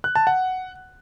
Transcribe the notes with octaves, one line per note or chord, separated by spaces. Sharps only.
F#6
A5
F#5